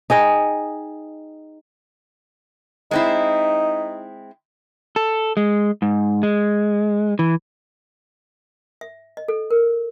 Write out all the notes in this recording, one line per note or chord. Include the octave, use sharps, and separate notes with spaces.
D#4 G#4 D#5 G5
G#3 C4 D#4 E4
A4
G#3
G#2
G#3
E3
E5
D#5
A4
A#4